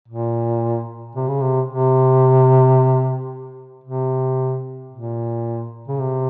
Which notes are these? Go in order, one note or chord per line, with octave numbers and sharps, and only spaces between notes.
A#2
C3
C#3
C3
C3
C3
A#2
C#3
C3